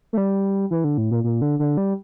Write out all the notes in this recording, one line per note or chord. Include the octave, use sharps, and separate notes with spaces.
A3
G3
E3
D3
A2
A#2
A#2
D3
D3
G3